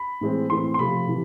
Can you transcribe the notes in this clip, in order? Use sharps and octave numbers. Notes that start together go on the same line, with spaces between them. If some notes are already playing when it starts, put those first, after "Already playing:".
Already playing: B5
A2 E3 G#3 C4
A2 E3 A3 C4 C6
C6
C3 F3 A3 B5
C3 E3